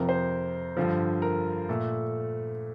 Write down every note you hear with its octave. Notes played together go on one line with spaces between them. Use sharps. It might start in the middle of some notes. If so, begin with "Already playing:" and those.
Already playing: F2 C3 F3 A#4
C5
G2 D3 F3
A#4
A#2 A3 A4